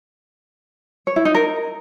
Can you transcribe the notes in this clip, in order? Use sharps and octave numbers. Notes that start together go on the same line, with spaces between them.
C#5
E4
D#4
A#4